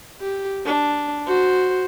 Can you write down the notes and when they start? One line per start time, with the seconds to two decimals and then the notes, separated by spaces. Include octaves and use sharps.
0.21 G4
0.65 D4
1.26 F#4 C5